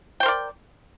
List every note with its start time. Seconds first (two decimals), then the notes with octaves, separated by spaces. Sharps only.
0.20 G5
0.23 C5
0.26 A#4
0.28 D5